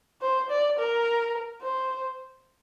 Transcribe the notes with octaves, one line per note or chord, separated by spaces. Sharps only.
C5
D5
A#4
C5